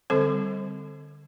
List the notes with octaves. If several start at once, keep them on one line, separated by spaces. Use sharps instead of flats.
D3 G3 C4 A4 C5